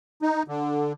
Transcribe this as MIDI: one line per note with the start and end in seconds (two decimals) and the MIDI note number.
0.22 0.43 63
0.48 0.93 50